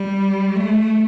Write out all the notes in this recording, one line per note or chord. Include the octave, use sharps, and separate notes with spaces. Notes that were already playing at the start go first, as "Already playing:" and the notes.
Already playing: G3
A3